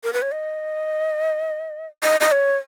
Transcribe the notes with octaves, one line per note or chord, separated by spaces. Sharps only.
A#4
B4
C#5
D#5
D#5
D#5
C#5